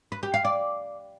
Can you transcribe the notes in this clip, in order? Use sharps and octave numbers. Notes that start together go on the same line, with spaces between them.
B4
G4
F5
D5